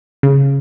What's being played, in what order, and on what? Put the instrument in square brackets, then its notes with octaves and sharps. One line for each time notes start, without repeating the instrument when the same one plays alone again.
[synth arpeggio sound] C#3